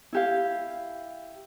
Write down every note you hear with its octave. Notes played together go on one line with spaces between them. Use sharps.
E4 G4 F5